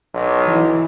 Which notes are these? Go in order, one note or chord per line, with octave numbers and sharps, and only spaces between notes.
B1
E3